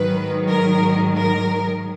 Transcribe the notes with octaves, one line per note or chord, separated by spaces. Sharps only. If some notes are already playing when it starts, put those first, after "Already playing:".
Already playing: G#2 D#3 F#3 B4
A#4
A#4